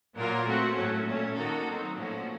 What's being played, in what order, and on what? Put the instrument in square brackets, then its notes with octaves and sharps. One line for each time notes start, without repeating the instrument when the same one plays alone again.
[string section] A#2 F#3 A#3 F4 A#4
A3 C4 F#4
A2 F#3 A3 C#4
A#2 A3 C#4
D#3 A#3 D#4 F#4 A4
F#3 C4 D#4
A#2 F3 A3 C#4 F#4